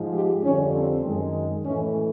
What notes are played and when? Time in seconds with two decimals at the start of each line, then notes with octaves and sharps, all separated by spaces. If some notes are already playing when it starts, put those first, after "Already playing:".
Already playing: G#2 F3 G#3
0.13 G4
0.43 F2 D3 G3 C#4
0.74 C4
1.05 F#2 D#3 G#3
1.65 A2 E3 A3 C#4